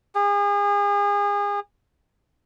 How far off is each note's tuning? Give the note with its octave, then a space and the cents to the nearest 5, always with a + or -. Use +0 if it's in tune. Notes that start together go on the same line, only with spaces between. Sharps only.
G#4 -35